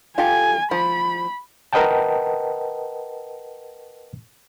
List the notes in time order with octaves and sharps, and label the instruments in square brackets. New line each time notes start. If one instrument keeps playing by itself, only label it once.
[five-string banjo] F4 G4 A4 [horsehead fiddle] G#5
[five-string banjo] F3 [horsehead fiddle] B5
[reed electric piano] A#4 B4 D#5 F#5 G5 A5